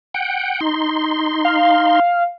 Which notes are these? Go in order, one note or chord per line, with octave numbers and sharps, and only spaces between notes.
F#5 G5
D#4 C6
F5